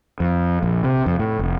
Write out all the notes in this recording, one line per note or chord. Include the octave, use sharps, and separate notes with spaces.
F2
A#1
C3
F2
A2
F1